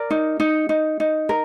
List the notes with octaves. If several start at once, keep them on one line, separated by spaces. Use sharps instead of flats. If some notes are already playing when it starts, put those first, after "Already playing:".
Already playing: A#4 D5
D#4
D#4
D#4
D#4
A#4